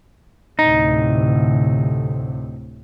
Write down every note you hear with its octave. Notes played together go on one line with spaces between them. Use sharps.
D2 A2 C3 D#4